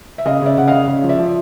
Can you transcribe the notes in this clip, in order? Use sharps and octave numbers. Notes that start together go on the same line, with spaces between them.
E5
C#3 D#5 F5
C#3 D5 E5
C#3 F#5
C#3 D#5 F5
C#3
F3
D5 E5
F3